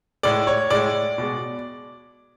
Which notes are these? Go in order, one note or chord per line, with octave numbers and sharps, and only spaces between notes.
A2 G#3 D5
C#5
A2 G#3 D5
B2 G#3